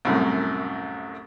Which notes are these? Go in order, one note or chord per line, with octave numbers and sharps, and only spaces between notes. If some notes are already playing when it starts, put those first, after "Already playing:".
C2 F#2 A2